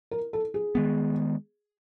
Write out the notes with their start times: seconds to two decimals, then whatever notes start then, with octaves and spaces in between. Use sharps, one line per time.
0.11 A#4
0.33 A4
0.54 G#4
0.75 D#3 G#3 B3